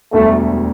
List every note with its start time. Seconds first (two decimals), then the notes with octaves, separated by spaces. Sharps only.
0.13 E1 D2 D3 G3 A3